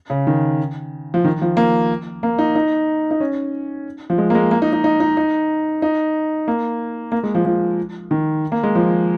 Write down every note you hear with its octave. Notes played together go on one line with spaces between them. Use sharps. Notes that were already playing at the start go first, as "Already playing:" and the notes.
C#3
D#3
F3
D#3
F3
A#3
A#3
D#4
D#4
D#4
C#4
F3
G#3
A#3
G#3
A#3
D#4
D#4
D#4
D#4
D#4
D#4
A#3
A#3
G#3
F3
F3
D#3
A#3
G#3
F3